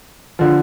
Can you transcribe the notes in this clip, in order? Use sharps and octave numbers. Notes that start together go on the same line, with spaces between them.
D3 F3